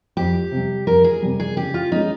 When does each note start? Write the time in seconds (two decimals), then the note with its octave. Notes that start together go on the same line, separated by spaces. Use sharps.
0.17 F2 G4
0.52 C3 G3
0.87 F2 A#4
1.04 G#4
1.22 C3 G3
1.40 G#4
1.57 C#3 G4
1.74 F4
1.92 G#3 C#4 D#4 F4 G#4